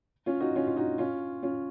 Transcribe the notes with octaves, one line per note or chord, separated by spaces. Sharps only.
C#4 F4
D#4 F#4
C#4 F4
F4
D#4 F#4
C#4 F4
C#4 F4